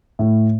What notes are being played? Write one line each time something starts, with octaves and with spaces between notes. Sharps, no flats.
A2